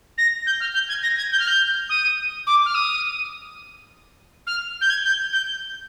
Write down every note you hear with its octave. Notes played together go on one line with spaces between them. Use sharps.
A#6
G6
F6
G6
G#6
A#6
G#6
G6
F6
G6
D#6
D6
F6
D#6
F6
G6
G#6
G6
G6